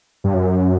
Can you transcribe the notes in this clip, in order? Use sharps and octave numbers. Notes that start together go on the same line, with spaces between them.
G2
F#2